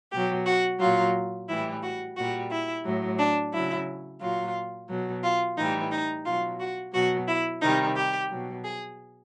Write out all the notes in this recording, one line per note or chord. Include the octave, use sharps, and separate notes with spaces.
B2 F#3 G4
F#4
A#2 F#3 F4
A2 E3 G3 E4
F#4
A#2 G3 F#4
E4
A2 F#3
D4
C#3 F#3 E4
A#2 F#3 F4
B2 F#3
F4
A2 E3 G3 D#4
D#4
B2 F#3 F4
F#4
B2 F#3 F#4
E4
C3 D#3 G3 D#4
G4
B2 F#3
G#4